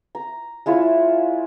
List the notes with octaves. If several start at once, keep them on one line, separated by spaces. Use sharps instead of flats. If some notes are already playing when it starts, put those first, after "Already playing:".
A#5
G#3 E4 F4 C#5